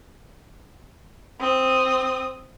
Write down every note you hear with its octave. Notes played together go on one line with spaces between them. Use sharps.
C4 D#6